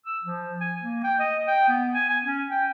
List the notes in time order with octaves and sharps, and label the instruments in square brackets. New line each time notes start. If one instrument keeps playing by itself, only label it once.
[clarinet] E6
F3
G#5
A#3
G5
D#5
G5
B3
G#5
G#5
C#4
G5